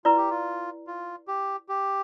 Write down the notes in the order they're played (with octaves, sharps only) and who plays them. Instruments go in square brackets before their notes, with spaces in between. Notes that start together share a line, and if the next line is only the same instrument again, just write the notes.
[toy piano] E4 B4 D5 [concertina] F4
[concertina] G4
F4
F4
G4
G4